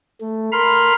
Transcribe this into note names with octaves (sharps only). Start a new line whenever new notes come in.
A3
A#4 B5 C6 F6